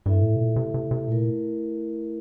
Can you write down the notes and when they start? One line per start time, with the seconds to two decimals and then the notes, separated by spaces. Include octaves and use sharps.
0.05 G2 A3 E4 A4 E5
0.22 A2
0.36 C3
0.40 A#2
0.56 C3
0.74 C3
0.91 C3
1.08 A#2 A3 E4 A#4